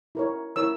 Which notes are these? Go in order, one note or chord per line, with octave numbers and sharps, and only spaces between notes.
E4 A#4 C#5
E4 A#4 C#5 E6